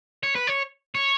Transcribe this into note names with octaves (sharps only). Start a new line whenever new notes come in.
C#5
B4
C#5
C#5